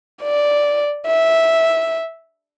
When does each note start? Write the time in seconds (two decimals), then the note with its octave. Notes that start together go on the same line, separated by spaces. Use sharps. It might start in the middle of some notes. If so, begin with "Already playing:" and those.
0.23 D5
1.07 E5